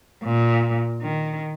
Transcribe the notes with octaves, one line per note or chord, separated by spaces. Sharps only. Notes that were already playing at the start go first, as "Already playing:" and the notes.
A#2
D#3